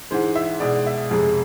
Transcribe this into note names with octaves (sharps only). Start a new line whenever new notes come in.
G#2 E3 G#3 C5
E5
B2 G#3 D5
E5
F2 C3 G#3 G#4